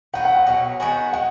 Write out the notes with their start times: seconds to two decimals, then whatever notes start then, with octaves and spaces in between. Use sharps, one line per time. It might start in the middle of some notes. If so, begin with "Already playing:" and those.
0.14 D#3 F#3 B3 F#4 F#5
0.25 F#5
0.36 F#5
0.47 B2 F#3 C#4 F#5
0.80 D#3 G#3 B3 F#4 G#5
1.13 G#3 F#5